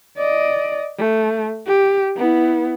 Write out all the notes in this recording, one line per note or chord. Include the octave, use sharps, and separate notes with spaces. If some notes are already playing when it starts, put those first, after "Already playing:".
D5 D#5
A3
G4
B3 E4